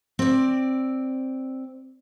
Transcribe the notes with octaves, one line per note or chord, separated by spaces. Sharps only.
C4 D5